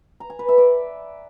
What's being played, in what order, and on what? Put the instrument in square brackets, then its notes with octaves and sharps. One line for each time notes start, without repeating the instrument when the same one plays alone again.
[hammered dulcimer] A#5
G#5
B4
E5
D5